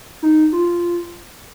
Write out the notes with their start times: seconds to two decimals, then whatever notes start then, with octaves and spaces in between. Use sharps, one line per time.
0.23 D#4
0.53 F4